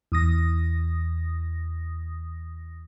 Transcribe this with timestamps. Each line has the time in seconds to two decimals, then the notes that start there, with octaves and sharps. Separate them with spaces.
0.12 E2 D#6 A#6